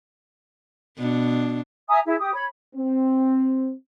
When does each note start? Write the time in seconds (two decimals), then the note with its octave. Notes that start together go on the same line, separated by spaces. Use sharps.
0.98 B2 D4
1.88 E5 G#5 A#5 D#6
2.05 E4 G#4
2.19 G4 D#6
2.33 C#5 B5
2.75 C4